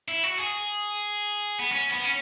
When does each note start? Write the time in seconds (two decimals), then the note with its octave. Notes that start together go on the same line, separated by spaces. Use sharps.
0.08 E4
0.24 F#4
0.38 G#4
1.59 B3
1.72 C#4
1.91 B3
2.04 C#4